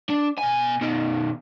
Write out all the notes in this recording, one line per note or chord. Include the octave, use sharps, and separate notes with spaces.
D4
B2 G#5
B2 D#3